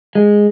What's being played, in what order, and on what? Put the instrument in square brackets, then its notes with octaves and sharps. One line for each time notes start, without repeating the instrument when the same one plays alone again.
[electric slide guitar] G#3